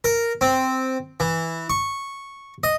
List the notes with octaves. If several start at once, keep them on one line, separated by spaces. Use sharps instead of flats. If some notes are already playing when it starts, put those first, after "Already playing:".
A#4
C4
E3
C#6
D#5